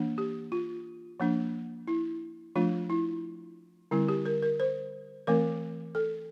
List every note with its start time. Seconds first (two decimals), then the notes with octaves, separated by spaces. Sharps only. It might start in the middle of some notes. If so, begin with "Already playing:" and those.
Already playing: E3 A#3 D4
0.18 G4
0.52 F4
1.20 F3 A#3 D4
1.88 E4
2.56 F3 A3 D4 F4
2.90 E4
3.91 D3 G3 C4 E4
4.08 G4
4.26 A#4
4.43 A#4
4.60 C5
5.27 E3 A3 C4 A#4
5.95 A4